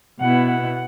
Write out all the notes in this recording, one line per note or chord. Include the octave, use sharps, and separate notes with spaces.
B2 B3 E4 F#5
F#5